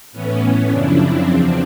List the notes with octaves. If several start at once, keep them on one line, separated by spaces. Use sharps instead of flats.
A2 E3 B3 C#4
F#2 C#3 F3 D4 E4
C4 D4
E2 C#3 F3